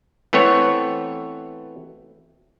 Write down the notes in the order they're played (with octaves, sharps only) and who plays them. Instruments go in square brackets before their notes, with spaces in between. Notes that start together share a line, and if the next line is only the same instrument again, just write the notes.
[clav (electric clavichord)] E3 A3 B3 C4 C#5